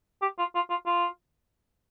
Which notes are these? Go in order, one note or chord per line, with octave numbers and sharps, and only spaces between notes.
G4
F4
F4
F4
F4